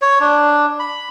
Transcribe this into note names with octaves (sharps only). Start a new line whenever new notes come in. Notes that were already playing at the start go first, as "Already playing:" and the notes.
C#5
D4
B5